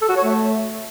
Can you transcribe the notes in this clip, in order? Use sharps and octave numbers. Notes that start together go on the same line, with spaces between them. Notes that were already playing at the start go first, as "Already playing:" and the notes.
A4
F#4
C#5
A3